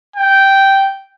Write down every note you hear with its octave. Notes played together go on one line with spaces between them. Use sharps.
G5